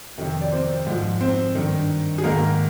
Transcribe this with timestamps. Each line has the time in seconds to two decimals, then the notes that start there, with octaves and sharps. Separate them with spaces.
0.18 F2 C3 D#3
0.41 D5
0.52 C4 C5
0.87 G#2 F3
1.21 C4 C5
1.55 G2 D#3
2.18 G#4
2.24 G#2 D#3 A#3 A#4